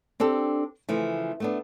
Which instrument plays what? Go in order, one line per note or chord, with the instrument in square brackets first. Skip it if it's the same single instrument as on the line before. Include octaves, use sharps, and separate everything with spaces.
[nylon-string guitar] C4 D4 G4 A4
C#3 E3 F3 A3
A3 B3 D4